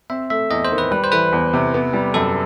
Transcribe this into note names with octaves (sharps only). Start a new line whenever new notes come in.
C4 E5
A3 E5
E2 D#5
C5
D#3
B4
G3 B4
C5
E3 B4
E2
C3
B3
G3
F#2 A4